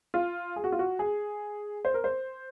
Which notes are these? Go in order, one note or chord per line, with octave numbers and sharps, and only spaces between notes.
F4
G#4
F#4
F4
F#4
G#4
C5
A#4
C5